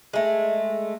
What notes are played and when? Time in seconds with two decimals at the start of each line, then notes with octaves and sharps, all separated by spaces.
0.13 G#3 A3